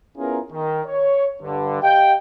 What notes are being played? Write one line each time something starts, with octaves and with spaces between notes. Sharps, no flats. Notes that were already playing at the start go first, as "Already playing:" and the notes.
B3 C#4 E4 F4 G#4 A#4
D#3
C#5
G2 D3
G4 D#5 F5 G5